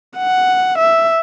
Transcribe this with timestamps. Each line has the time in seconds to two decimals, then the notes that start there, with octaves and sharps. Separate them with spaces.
0.18 F#5
0.78 E5